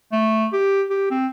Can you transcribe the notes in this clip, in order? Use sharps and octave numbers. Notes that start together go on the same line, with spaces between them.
A3
G4
G4
C4